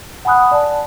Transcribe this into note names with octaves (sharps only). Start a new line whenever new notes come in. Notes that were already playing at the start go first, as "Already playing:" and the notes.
F#5 G#5 B5 D#6 F#6
D5 A5